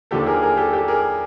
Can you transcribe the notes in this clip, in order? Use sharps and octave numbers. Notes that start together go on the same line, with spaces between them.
D#2 D3 F3 G4 A4
G#4 A#4
G#4 A#4
G4 A4
G4 A4
G#4 A#4